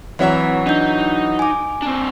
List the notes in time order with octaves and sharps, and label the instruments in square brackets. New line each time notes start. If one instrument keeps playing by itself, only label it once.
[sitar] E3 F#3 E5 [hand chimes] C4 B4
[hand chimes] D4 G6 [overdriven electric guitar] D#4
[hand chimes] G#5 D6
[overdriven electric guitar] C4 D4